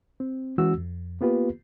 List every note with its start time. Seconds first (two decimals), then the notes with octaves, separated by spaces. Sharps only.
0.20 C4
0.58 E3 G#3 C#4 F#4 E6
0.78 F2
1.21 A#3 B3 F4 G4 B4